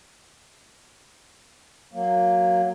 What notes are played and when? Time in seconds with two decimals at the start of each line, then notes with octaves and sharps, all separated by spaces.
1.93 F#3 A#3